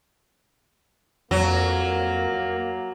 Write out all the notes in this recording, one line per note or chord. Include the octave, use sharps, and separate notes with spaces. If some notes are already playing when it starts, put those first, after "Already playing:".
F2 F#3 A#3 A#5